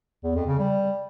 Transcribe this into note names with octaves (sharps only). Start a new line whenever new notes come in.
E2
F2
C#3
G3